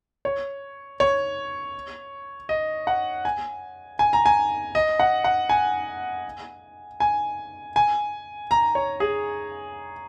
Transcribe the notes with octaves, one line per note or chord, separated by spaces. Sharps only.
C#5
C#5
D#5
F#5
G#5
G#5
A#5
G#5
D#5
F#5
F#5
G#5
G#5
G#5
A#5
C#5
G#4